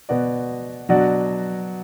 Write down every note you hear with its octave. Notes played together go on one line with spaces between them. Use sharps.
B2 B3 F#4 D5
B2 F#3 D4 F#4 D5